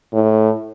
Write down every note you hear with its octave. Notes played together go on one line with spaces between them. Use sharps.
A2